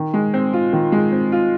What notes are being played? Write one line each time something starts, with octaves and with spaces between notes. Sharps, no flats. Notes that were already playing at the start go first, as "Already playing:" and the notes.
Already playing: D#3
G#3
C4
F4
D#3
G#3
C4
F4